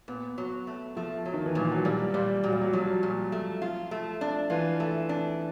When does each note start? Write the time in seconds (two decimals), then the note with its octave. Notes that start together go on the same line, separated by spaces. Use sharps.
0.08 A#2 B3
0.38 F#3
0.67 A3
0.96 F3 A3
1.25 F#3
1.33 D#3
1.46 E3
1.55 A#2 F3
1.72 F#3
1.85 A#2 G3
2.14 A#2 G3
2.44 A#2 F#3
2.53 G3
2.61 F#3
2.73 F3 F#3
3.03 A#2
3.32 A3
3.62 F4
3.91 A3
4.21 D4
4.50 E3 F4
4.80 A3
5.09 D4